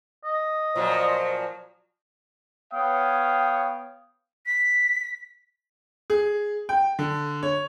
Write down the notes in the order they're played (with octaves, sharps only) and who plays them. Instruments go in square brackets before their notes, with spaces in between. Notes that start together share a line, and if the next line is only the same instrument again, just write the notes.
[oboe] D#5
[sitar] A#2 F3 F#3 [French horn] C5
[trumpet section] B3 C#5 F5 G5 D#6
[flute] B6
[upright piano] G#4
G5
D3
C#5